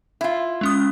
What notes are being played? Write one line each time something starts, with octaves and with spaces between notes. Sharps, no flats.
E4 F4
G#3 C#4 D#6